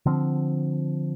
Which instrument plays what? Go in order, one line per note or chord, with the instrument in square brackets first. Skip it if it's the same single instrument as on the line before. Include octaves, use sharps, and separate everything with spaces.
[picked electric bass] D3 F3 C4